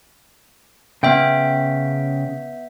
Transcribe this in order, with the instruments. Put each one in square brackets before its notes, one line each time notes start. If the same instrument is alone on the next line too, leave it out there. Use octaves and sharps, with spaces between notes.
[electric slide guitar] C#3 G5 [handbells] B3 E5 G6